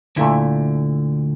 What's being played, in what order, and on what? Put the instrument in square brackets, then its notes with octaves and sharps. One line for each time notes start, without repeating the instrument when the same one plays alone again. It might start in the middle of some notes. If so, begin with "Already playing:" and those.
[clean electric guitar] D2 D3 [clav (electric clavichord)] A#2 A3 E4